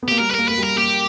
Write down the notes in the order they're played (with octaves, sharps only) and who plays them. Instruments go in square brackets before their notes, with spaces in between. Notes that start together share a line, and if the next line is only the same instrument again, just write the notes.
[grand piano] B3
[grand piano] A#3 [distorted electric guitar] G4
[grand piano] G3 [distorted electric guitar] A#4
[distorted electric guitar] B4
[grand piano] A#3 [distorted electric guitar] A#4
[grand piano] A#3 [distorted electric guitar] B4
[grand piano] G3
[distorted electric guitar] A#4
[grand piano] A#3 [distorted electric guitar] G4